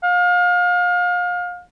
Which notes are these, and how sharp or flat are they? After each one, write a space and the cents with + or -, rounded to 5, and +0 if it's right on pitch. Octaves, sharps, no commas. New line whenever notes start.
F5 +30